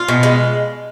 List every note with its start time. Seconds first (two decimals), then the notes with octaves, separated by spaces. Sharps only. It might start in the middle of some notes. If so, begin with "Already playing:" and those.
Already playing: F4
0.08 B2
0.23 G#3